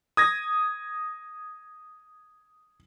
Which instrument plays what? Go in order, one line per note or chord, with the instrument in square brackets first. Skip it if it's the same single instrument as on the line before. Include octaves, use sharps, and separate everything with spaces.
[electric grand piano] D#6 G#6 A#6